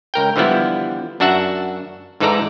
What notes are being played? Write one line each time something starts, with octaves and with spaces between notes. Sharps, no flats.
C#2 A#4 G5
D3 E3 F3 G3 B3 E4
F#2 D4 F#4 E5 F#5
G#2 E3 D#4 A4 D5 A#5